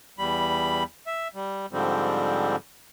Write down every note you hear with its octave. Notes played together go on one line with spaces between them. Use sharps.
E2 G3 B5
E5
G3
G#2 D3 F3 G3 C4